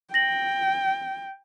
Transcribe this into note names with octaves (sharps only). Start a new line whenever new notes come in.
G5 A#6 F#7